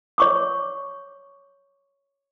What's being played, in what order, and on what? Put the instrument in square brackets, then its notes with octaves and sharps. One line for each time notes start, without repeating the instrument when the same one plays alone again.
[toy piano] C#5 C#6 D6